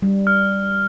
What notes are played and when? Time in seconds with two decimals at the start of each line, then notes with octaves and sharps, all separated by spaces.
0.02 G3
0.27 F6